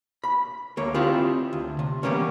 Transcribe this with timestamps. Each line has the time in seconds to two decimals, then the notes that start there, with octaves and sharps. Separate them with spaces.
0.24 B5
0.77 D2 A#3 C#5
0.95 C4 D4 E4 F4 G4 G#4
1.53 D2
1.79 C3
2.03 E3 G3 A#3 B3 C#4